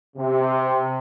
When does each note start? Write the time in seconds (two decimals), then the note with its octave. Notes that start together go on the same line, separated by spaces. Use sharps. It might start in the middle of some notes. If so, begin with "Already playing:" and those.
0.17 C3